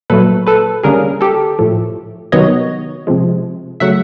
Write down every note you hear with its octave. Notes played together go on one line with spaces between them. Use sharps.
A#2 F#3 A3 A4 B4
A4 B4
D3 G3 A#3 C#4 G#4 A#4
G4 A4
A2 F3 A3
C3 D#3 F#3 B3 C#5 D#5
C3 F3 G#3
C#3 F#3 A3 E5 F#5